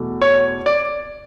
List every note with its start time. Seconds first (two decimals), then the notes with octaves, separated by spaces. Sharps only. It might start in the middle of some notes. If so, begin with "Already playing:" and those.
Already playing: E2 B2 A3
0.22 C#5
0.66 D5